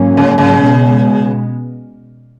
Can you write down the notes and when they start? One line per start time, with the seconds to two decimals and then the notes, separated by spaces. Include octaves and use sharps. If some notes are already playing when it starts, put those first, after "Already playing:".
Already playing: G#2 F#3 A#3 C#4
0.17 C#3
0.38 C#3
0.58 B2 G#3 B3